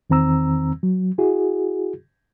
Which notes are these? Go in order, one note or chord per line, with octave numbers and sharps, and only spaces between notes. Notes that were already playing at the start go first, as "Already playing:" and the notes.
E2 D#3 C4 A#5 E6
F#3
E4 F#4 G#4